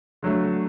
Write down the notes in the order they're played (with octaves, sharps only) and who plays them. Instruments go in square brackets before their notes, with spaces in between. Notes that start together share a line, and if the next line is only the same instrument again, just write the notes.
[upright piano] D3 F#3 A3